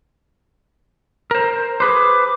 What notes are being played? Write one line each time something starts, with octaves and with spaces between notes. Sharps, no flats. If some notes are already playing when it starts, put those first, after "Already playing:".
A#4 C5
G#4 B4 C5 D6